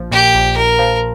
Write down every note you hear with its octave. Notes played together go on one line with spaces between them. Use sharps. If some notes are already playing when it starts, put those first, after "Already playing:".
Already playing: A#1 F3
A#2 G4
A#1
A#1 A#4
F3